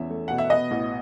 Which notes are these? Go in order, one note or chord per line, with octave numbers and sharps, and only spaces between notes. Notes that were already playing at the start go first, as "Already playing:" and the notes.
Already playing: E2 C#4 E5
A3
B2 F#5
E5
B3 D#5
A1